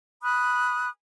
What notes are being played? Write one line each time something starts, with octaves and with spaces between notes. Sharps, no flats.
B5 D#6 F#6